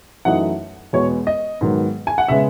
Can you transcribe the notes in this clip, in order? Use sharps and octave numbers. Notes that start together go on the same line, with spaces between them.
F#2 E3 A3 D#4 F#5
E2 B2 G#3 B3 C#5
D#5
G#2 D#3 F#3 B3
G#5
F#5
C#3 G#3 B3 E5